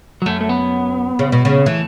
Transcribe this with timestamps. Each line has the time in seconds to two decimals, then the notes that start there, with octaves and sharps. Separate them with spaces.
0.22 F#3
0.26 F#2 A3
0.41 A3
0.49 B3
1.19 C#3
1.32 B2
1.45 C#3
1.66 E3 A3